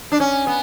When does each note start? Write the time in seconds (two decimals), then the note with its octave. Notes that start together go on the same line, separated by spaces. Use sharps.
0.12 D4
0.20 C#4
0.47 B3